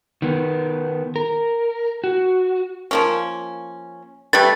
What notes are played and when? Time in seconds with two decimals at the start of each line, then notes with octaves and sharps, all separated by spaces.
0.22 D#3 B3
1.16 A#4
2.04 F#4
2.91 F3 A#3 C#4
4.33 G3 A3 B4 A6